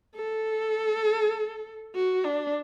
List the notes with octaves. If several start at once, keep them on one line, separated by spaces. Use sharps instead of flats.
A4
F#4
D4